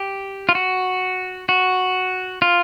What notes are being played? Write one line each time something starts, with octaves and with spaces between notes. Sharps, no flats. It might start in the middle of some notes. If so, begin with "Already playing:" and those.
Already playing: G4
F4
F#4
F#4
F4